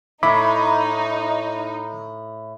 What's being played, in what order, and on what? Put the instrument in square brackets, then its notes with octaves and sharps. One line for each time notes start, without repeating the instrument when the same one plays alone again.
[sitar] A2 [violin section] D#4 [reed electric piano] E5 B5 D6